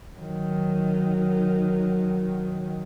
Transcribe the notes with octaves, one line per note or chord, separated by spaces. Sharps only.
D#3 F#3